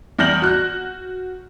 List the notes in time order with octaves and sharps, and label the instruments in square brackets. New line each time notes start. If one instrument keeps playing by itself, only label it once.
[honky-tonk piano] E2 G3 F6 G6 A#6 F#7
F#4 F#6